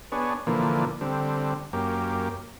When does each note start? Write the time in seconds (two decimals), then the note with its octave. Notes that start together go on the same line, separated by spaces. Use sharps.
0.12 B3 D4 G#4 C#5
0.47 A#2 D3 E3 F3 A#3
1.01 D3 G3 C4
1.73 F#2 A#3 G4